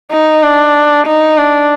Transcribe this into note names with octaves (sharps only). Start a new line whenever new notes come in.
D#4
D4
D#4
D4